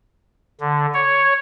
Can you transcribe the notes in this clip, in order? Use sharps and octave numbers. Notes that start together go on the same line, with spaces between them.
D3
C#5